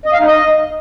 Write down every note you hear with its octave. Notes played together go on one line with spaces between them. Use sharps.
D#5
F5
D#4
D#5